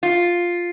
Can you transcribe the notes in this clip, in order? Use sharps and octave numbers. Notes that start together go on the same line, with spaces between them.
F4